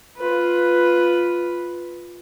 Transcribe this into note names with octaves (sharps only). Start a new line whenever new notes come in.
F4 B4